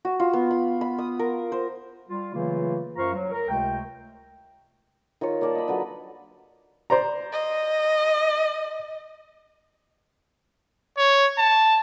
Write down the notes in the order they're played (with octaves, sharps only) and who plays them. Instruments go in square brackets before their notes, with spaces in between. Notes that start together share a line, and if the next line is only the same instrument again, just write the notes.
[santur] F#4
F4
B3
B5
B5
D#6
A#4
C5
[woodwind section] G3 F4
C#3 E3 F#3 A3 A#3 F4
F#2 F4 C5 F5 A#5 C#6
F#3
A#4
C#2 C3 G#3 A3 G5
[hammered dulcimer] D#3 F4 A#4 C#5
A#3 D5 A5
D#5 B5
D3 F#3 B4 D5
[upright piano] C5 D5 A#5
[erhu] D#5
[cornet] C#5
A5